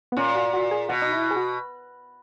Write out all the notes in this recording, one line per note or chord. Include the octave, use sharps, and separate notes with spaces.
B3
A#2 C#4
F#4
F#4
G#4
B2 F#4
D#4
E4
G#4
F#4